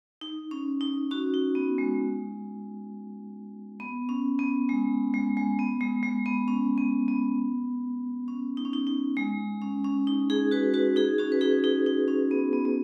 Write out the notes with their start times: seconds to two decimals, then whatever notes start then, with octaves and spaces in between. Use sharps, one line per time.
0.21 D#4
0.51 C#4
0.81 D#4
1.11 C#4 F#4
1.34 D#4
1.55 B3
1.78 G#3
3.80 B3
4.09 C#4
4.39 B3
4.69 G#3
5.14 G#3
5.37 G#3
5.59 B3
5.81 G#3
6.03 G#3
6.26 B3
6.48 C#4
6.78 B3
7.08 B3
8.28 C#4
8.57 D#4
8.65 C#4
8.73 D#4
8.87 D#4
9.17 G#3
9.62 C#4
9.84 C#4
10.07 D#4
10.30 D#4 G#4
10.51 F#4 B4
10.74 F#4 B4
10.96 D#4 G#4
11.18 C#4 F#4
11.32 B4
11.41 D#4 G#4
11.64 D#4 G#4
11.86 D#4
12.08 C#4
12.31 B3
12.53 B3
12.65 B3